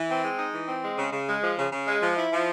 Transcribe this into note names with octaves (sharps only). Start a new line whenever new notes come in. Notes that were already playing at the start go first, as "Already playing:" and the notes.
Already playing: E3
C4
G#3
D#4
E3
C4
G#3
C#3
C#3
G#3
F3
C#3
C#3
G#3
F3
E4
F3